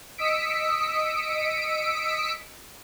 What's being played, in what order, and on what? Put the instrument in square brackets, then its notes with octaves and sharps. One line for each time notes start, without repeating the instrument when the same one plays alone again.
[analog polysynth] D#5 D#6 E6 B6 C#7 D7